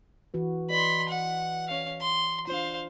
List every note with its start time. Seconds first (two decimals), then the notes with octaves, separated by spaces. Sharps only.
0.34 E3 F#4 B4
0.70 B4 D5 D#5 B5 C6
1.08 F#5
1.68 C#4 F5
2.01 C6
2.47 D4 F4 C5 F5